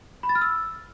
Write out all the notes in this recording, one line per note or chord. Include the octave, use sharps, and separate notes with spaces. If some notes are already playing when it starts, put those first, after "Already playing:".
B5
A6
F6
E6